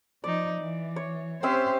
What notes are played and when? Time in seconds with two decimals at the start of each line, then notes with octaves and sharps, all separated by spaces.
0.24 F3 D#4 D5
0.61 E3
0.96 C#5
1.43 C4 C#4 G4 C5 E5